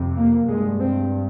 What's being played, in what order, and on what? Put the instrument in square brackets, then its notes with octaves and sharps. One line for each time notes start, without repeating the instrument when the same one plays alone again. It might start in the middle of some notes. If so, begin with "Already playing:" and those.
Already playing: [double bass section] F2 C3
A#3
G2 G#3
C4